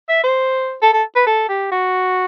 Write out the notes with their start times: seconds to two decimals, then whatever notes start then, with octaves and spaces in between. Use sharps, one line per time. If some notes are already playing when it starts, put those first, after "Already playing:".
0.09 E5
0.23 C5
0.82 A4
0.93 A4
1.15 B4
1.27 A4
1.49 G4
1.71 F#4